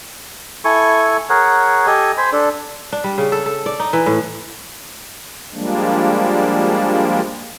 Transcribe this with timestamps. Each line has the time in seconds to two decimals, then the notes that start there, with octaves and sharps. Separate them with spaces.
0.65 E4 A4 G#5 C#6
1.29 G#4 A#4 C#5 F#5
1.87 G4 A4 D#5 G#5
2.18 C5 G#5 B5
2.32 D4 A4
2.92 D4
3.04 G3
3.18 C#3
3.32 A4
3.46 A4
3.66 D5
3.80 D#4
3.93 E3
4.06 A2
5.54 F3 G3 G#3 A#3 D4